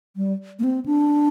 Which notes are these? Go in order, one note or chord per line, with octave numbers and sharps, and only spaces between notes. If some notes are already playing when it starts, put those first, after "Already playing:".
G3
A#3
C4
D4